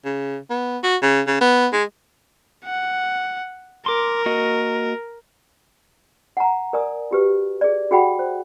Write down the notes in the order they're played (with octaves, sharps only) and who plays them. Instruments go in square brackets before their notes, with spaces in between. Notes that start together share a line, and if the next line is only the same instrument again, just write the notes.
[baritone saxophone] C#3
B3
F#4
C#3
C#3
B3
G#3
[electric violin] F#5
[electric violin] A#4 [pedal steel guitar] C6 D6
[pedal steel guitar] A#3 F#4 D#5
[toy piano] F#5 G#5 A#5
A#4 D5 G#5 D#6
F#4 G4 B4
G#4 D5
F#4 G#4 F#5 G5 B5
C5